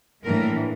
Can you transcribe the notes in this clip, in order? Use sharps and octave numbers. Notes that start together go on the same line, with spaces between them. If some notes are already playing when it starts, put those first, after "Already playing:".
A2 E3 A#3 D4 A#4